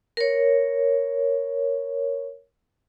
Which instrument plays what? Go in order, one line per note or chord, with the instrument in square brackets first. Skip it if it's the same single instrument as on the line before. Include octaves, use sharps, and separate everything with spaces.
[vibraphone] A#4 C#5